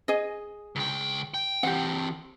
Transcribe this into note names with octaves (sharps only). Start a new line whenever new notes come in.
G#4 D#5
C#2 G5
G5
E3 C4 G4 F#5